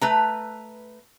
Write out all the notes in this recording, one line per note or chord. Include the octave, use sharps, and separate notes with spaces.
A3 B4 A#5